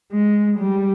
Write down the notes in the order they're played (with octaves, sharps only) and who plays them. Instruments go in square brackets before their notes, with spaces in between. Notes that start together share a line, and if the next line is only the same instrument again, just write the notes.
[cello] G#3
G3